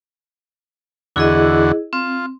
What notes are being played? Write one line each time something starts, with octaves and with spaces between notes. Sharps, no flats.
E2 D3 E4 F#4 G#4 D#5
C4 F4